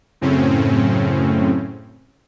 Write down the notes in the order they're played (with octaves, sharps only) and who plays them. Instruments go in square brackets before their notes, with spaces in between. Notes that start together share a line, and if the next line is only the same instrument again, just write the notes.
[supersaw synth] F#2 A2 C#3 C4 C#4